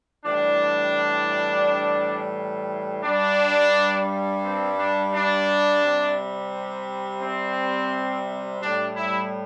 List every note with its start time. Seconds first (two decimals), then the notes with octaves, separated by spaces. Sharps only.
0.25 A2 E3 G3 D4
3.04 G2 G3 D4
4.44 C4
4.78 D4
5.14 D4
5.83 C3 G3
7.22 C4
8.61 A2 G3 D4
8.96 E4